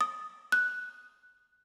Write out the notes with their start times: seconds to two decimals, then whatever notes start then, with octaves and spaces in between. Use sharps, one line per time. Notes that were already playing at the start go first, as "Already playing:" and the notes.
0.01 D#6
0.52 F#6